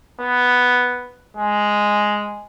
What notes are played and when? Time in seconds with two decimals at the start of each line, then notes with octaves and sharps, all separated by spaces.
0.21 B3
1.37 G#3